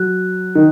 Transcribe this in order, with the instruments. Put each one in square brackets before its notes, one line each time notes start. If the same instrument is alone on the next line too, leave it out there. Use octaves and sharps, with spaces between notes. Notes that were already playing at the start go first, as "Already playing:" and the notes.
Already playing: [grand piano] F#3 [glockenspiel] F#6
[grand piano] D#3